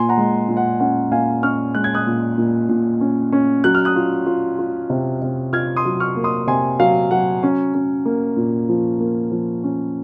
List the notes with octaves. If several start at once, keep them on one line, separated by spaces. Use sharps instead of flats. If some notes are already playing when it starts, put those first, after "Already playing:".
Already playing: A#2 G#5 C6
F#5 A#5
G#3
A#2
F#5
C#4 F#5
A#2 F5 G#5
C#4 C#6 F6
G#3 F#6
G#6
D#6 F#6
A#2
A#2
A#2
C#4
C#4
F#3 F#6
F6
D#6 F#6
F4
F4
F4
C3
C3
F4 F6 G#6
C6 D#6
F#3
C#6 F6
A#3
C6 D#6
C3 G#5 C6
F#3 F5
F#3 F#5
C#4
C#4
A#3
A#2
F3
A#3
F3
C#4